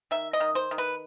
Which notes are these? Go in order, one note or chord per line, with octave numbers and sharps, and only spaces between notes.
D#3 E5
D#5
D#3
C5
D#3
B4